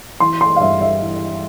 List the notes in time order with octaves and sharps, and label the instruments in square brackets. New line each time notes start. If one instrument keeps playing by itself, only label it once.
[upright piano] E3 C6
C6
F5
G2 E5
E5
E3